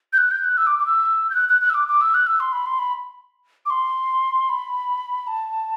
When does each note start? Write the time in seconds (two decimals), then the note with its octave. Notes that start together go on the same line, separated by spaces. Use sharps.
0.13 G6
0.18 F#6
0.31 G6
0.44 F#6
0.57 E6
0.67 D6
0.79 D6
0.86 E6
1.30 G6
1.35 F#6
1.49 F#6
1.61 F#6
1.70 E6
1.74 D6
1.88 D6
2.01 E6
2.14 F#6
2.27 E6
2.40 C6
2.52 B5
2.66 C6
2.79 B5
3.66 D6
3.70 C6
4.49 B5
5.27 A5